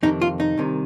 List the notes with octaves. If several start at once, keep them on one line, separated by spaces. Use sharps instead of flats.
F2 C3 D#3 D#4
F4
D#4
C2 C3 D#3